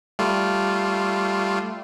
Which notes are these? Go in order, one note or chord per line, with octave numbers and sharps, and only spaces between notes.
G3 A3 F4